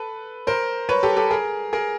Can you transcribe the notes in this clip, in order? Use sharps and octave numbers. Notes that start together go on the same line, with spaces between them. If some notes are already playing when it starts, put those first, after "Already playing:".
Already playing: A4 B4
A#4 C5
B4 C#5
G4 A4
G4 A4
G#4 A#4
G#4 A#4